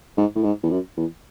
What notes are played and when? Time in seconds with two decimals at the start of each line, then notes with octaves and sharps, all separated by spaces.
0.17 G#2
0.36 A2
0.44 G#2
0.63 E2
0.70 F#2
0.97 E2